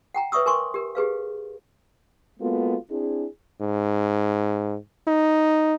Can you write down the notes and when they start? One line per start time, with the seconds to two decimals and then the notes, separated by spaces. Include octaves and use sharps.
0.15 F#5 G5 A#5
0.32 B4 C#5 E5 C#6 D#6 E6
0.46 A#4 G#5 C6 C#6
0.74 G4 A#4
0.95 G4 G#4 B4 F5
2.40 G#3 A#3 B3 F4 F#4 A4
2.91 C4 D4 E4 G#4
3.61 G#2
5.08 D#4